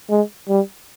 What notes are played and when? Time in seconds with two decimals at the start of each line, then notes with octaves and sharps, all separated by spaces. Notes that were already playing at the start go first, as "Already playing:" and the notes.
0.10 G#3
0.49 G3